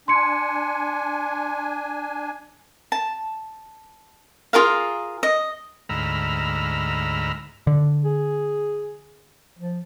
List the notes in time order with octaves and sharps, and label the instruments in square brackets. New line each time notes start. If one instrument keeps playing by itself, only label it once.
[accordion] D4 G#5 [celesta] C6 C#7
[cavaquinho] A5
F4 G#4 A#4 F5
D#5
[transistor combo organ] D2 G#2 A#5 B5 E6 F6
[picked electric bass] D3
[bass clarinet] G#4
F3